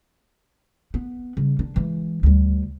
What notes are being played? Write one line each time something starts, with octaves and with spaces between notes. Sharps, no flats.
B3
C#3 G3
D#3 D4
E3 G#3
D2 G3